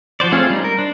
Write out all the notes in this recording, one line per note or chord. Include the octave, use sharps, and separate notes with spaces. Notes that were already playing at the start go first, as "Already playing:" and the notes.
F3 F#4 C5 D5
A3 C4 C#4 F4 G#4
G3 D#4
A#4
D4 C5